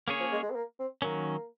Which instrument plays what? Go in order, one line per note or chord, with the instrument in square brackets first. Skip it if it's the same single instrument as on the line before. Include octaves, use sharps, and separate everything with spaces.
[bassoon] C#3 [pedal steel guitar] A#3 C#4 G#4 C#5
[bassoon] F3
G#3
G#3
C4
A#3
C4
[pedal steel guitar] D#3 F#3 C#4 [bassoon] A#3